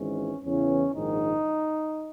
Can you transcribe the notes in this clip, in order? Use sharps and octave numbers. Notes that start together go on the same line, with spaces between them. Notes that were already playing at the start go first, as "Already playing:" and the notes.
Already playing: G#1 G#2 E3 C#4
E2 C#3 E3 C#4
A#1 G#2 D#3 D#4